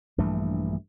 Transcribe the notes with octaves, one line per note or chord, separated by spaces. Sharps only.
A#1 G2 E3 A3